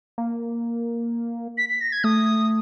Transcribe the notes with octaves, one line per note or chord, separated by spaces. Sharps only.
A#3
B6
B6
A#6
G#6
A3 D#6